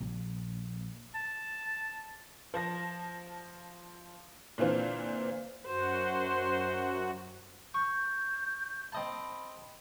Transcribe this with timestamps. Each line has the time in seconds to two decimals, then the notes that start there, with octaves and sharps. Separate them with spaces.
0.01 A#1
1.15 A5
2.54 F3 A5 A#6
4.58 A#2 D3 E3 C4 F4
5.67 F#2 F#4 C5
7.74 C#6 G6
8.92 C4 D#5 A5 B5